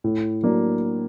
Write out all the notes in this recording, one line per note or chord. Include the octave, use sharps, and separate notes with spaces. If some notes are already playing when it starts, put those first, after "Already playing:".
A2
F#3 A#3 D4